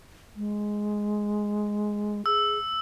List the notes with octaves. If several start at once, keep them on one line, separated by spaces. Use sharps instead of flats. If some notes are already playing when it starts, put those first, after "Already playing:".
G#3
G#4 E6